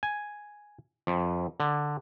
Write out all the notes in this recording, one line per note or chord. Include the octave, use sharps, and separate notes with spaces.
G#5
F2
D3